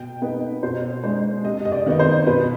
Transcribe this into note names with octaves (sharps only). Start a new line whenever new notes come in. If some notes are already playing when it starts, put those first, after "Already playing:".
Already playing: B2 G5
B3 D#4 B4
B2 C5
G#3 D4 C5
C3 D#5
D#5
D5
D#3 B3 D#4
C5
B2 B4